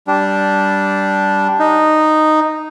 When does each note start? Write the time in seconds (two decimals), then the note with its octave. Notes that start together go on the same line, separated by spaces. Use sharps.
0.07 G3 D4
1.59 D#4